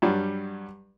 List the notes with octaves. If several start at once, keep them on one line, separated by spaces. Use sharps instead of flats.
G2 F#3 G3